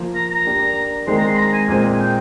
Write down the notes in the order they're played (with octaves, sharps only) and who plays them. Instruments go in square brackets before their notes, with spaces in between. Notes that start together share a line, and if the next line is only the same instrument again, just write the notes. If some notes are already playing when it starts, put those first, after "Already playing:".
Already playing: [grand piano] F3 A#3 F4 A#4
[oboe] A#5
A#5
[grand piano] A#3 D4 G4
[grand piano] D#3 G#3 C4 [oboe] C6
[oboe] A#5
C6
A#5
G#5
[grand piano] A#2 G#3 C4 [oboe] G#5
[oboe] G5